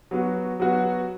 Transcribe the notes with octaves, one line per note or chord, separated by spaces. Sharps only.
F#3 B3 F#4
F#3 B3 F#4